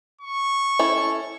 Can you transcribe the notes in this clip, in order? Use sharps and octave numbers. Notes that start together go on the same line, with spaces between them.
C#6
C#4 E4 A4